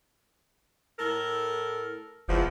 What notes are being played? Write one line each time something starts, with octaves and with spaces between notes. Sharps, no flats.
A2 A4 A#4
F#1 E2 F3